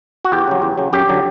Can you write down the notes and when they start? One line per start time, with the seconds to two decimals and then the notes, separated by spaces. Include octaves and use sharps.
0.25 F#4
0.32 E2 G4
0.47 C#3 F#3
0.62 E2
0.78 C#3 F#3
0.93 F#2 G4
1.09 D3 F#3